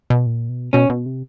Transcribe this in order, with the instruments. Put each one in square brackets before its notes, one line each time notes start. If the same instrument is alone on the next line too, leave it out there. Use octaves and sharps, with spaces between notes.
[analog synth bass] B2
A#2
B2
[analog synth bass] B2 [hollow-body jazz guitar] C#4
[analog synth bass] B2
C3